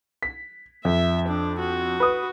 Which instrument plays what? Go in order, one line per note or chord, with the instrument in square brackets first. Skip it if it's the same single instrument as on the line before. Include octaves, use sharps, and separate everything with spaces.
[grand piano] B6
[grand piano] F2 [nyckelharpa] E5
[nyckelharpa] D4
F#4
[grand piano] B4 D#6